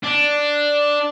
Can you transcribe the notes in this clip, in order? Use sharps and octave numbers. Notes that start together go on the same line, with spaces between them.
D4